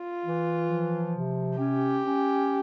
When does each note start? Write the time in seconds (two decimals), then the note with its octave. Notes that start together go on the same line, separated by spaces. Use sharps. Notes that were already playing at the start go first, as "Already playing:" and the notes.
Already playing: F4
0.24 E3
0.69 F3
1.14 C3
1.58 C#4 G4
2.03 C#4